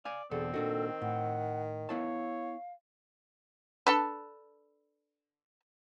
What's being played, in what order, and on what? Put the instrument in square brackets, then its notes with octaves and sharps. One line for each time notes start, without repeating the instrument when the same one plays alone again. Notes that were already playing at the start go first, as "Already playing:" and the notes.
[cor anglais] D5 [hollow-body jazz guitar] F5 G#5
[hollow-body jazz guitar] E2 B2 A4 [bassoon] D3 [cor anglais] C4 [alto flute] G#4
[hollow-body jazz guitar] A#2 D4 F#4 [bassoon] D#3 [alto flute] A4
[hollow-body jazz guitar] A2 [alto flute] F#5
[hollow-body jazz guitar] B3 E4 A5 [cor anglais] C#5 [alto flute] F5
[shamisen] D4 A4 B4